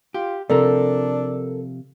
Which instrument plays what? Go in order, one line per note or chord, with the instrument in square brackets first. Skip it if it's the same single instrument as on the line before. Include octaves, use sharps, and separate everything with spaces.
[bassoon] F4 [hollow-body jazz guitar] G4
[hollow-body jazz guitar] C3 F3 [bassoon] D4 [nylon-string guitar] A4 A#4 C5